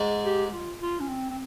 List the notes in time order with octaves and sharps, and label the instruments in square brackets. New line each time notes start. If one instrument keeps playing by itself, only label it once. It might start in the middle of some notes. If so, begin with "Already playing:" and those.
Already playing: [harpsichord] G#2 G#3
[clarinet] G4
F4
F4
C#4
C4
C4